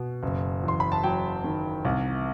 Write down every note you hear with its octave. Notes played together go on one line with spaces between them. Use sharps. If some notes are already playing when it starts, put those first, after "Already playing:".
Already playing: B2
F#1
E2 C6
B5
A5
F#3 G5
D#3
C2